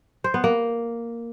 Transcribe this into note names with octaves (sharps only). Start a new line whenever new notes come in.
C5
B3
A#3